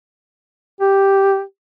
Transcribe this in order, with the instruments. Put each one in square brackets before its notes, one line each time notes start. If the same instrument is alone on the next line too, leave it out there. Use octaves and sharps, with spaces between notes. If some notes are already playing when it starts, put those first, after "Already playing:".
[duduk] G4